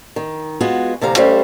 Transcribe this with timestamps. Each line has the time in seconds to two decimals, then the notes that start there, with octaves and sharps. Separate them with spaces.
0.16 D#3
0.61 G#3 B3 F4 F#4 G#4
1.01 D2 C3 E3 F5 A#5
1.16 G3 A3 C#4 C5 E5 F5